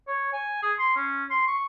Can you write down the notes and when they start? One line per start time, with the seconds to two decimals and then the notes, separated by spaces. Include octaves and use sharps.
0.08 C#5
0.33 G#5
0.63 G#4
0.79 C6
0.96 C#4
1.30 C6
1.47 C#6